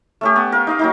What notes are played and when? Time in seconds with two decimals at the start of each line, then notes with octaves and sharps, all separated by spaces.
0.21 A3 C#4 G4
0.36 B3
0.52 A#4 F5
0.67 D#4 D#5 F5
0.79 F#3 A#3 D#4